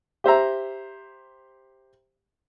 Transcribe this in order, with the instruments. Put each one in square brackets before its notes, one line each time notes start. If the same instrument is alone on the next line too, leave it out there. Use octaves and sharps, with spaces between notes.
[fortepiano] G4 C5 E5 A#5